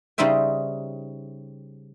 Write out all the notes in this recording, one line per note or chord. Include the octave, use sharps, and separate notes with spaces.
C#3 G3 D#4 C5 E5 G5